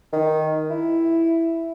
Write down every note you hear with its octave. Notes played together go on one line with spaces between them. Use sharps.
D#3
E4